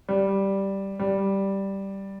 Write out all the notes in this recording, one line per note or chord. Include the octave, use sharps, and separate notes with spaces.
G3
G3